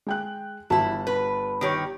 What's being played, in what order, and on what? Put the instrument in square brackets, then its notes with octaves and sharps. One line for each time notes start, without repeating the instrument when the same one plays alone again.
[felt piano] G#3 G5 F#6
[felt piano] G1 F#4 A5 [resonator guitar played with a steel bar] E3 E4
[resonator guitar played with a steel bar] B4
D#3 G4 C#5